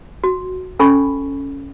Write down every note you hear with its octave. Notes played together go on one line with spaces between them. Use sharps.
F#4
C#4 A4 G#5 B5 C#6